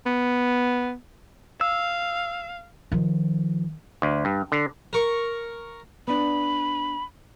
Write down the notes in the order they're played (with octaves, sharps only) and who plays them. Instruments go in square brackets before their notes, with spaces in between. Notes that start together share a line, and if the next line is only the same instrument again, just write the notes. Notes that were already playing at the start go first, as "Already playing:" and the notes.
[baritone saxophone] B3
[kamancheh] F5 [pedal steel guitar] E6
[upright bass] D#3 F3
[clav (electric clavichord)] D2
G2
D3
[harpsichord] A#4 C#6
[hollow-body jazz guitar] B3 D4 [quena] B5